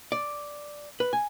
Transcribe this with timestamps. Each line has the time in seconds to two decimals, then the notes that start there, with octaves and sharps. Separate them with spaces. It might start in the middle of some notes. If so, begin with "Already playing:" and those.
0.12 D5
1.00 B4
1.13 G#5